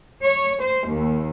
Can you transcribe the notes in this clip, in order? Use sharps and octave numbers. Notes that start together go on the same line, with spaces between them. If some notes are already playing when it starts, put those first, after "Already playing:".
C#5
C5
D#2